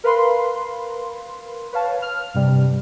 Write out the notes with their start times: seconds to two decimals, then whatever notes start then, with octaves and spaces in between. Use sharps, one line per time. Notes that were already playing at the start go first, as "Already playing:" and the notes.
0.04 A#4 B4 F5 B5 C6
1.73 B4 C#5 F5 A5
2.02 F6
2.34 G2 C3 G3